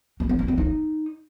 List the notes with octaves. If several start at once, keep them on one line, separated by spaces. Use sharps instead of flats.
A#3
B3
A#3
C4
D#4